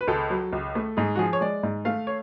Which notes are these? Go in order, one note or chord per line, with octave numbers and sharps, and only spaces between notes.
B4
C#2 A4
F#3
C#2
A3
G#2 G#4
F#4
F3 G#4
C#5
G#3 D5
G#2
A3 F5
C#5